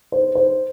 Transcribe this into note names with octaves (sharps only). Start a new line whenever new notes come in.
C5
C5